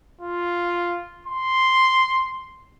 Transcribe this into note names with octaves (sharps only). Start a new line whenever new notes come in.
F4
C6